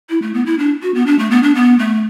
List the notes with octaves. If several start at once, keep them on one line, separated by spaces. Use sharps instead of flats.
E4
A3
B3
E4
D4
F#4
B3
D4
A3
B3
D4
B3
A3